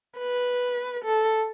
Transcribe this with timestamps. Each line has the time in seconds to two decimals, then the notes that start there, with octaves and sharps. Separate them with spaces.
0.19 B4
1.05 A4